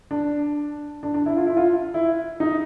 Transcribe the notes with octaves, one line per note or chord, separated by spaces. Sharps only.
D4
D4
D4
E4
F4
E4
F4
E4
D#4